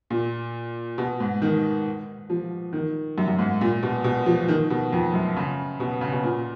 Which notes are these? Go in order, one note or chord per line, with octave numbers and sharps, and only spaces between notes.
A#2
B2
G#2
D#3
F3
D#3
F#2
F#2
G#2
A#2
B2
B2
F3
D#3
B2
F2
F#2
C#3
B2
C#3
B2
A#2